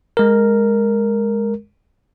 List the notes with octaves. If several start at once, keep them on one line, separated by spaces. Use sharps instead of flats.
G#3 A#4